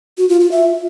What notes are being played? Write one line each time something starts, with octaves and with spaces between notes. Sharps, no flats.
F#4
F4
F4
E5